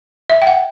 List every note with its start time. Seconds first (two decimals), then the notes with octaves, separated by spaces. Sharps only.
0.30 E5
0.42 G5
0.47 F#5